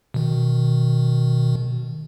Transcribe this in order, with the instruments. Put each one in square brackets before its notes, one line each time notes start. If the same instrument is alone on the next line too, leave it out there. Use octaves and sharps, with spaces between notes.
[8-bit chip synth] B2 D#3